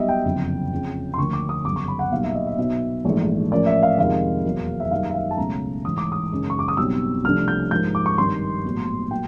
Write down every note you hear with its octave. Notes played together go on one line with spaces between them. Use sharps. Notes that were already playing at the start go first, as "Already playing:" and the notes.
Already playing: B1 B2 G3 D#5 E5
G5
F#1 F2 D3
F2 C#3 F3
C6
D2 D3 F3 A#3 C#6
D6
D#6
G1 F#2 C#3 D6
C#6
B5
F#5
B1 A#2 G3 F5
E5
D#5
E5
B1 B2 F#3 B3 E5
A#1 G#2 E3 A3
A2 F3 A#3 C#4 D5
E5
F5
F2 C3 D#3 G#3 F5
E2 B2 F#3 A#3
E5
F#2 D#3 G3 A#3 D#4 F5
E5
F5
A5
C#2 B2 F#3 A3 C#4 A#5
A1 G#2 E3 D#6
D6
D#6
F#1 F#2 D#3 G#3 C#4
C#6
D6
D#6
B1 B2 G3 C4 E6
C2 C3 F3 A3 D4 F6
G6
G#2 F3 A#3 G6
D6
C#6
G#1 G2 D#3 C6
A#1 A2 F#3 B3
A#2 F#3 G5